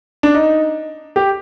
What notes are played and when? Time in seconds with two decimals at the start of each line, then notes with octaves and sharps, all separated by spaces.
0.23 D4
0.34 D#4
1.16 G4